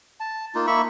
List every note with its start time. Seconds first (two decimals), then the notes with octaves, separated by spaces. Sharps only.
0.20 A5
0.55 A#3 D#4 F4
0.67 A#3 E5 B5 C#6